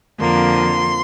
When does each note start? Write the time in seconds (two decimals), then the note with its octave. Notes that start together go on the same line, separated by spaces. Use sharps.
0.18 F2 D3 F3 A#3 C6